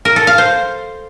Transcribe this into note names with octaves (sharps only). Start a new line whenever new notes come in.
A#4
A4
F5
C5